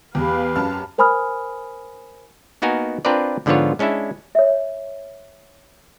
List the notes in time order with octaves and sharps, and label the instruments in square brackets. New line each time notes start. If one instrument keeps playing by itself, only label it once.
[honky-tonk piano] E2 [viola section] G4 B4 F5
[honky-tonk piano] F#2 A5 F6
[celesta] A#4 C5 G#5 B5 D#6 F6
[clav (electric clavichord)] A#3 B3 D#4 F#4 A#4 G#5
C4 D4 F4 A#4 B4 D5
G#2 D3 F3 B3 F4 C#5
G#3 C#4 D4 E4 E5
[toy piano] C#5 E5